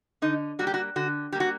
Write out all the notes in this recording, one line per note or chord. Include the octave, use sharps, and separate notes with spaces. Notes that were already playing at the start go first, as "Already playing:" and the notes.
D3 D#4
G3 A#3 F#4
G4
F#4
D3 F#4
G3 A#3 G4
F#4